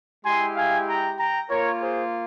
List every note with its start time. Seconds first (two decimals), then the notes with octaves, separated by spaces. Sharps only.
0.24 G#3 E4 G4 G#5 C6
0.56 F5 G#5
0.87 G5 A#5
1.18 G5 A#5
1.49 A#3 F4 A#4 C#5
1.80 G#4 C5